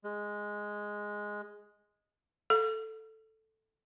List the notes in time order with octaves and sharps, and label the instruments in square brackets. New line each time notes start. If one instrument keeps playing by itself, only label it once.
[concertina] G#3
[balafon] A4